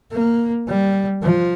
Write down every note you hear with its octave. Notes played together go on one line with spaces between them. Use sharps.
A#3
G3
F3